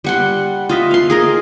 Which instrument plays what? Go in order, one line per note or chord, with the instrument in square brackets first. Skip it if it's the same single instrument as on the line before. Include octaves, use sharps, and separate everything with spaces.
[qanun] G3 F#5 C6
F4 D#5 E5
F5 C6
G#4 A#4 D#5